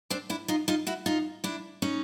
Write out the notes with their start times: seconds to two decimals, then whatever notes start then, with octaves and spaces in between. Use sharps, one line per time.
0.10 C4 D4
0.30 D4 E4
0.48 D#4 F4
0.68 D#4 F4
0.87 E4 F#4
1.06 D#4 F4
1.44 D4 E4
1.82 C#4 D#4